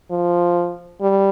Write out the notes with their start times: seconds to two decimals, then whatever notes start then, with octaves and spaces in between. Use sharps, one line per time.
0.11 F3
1.01 G3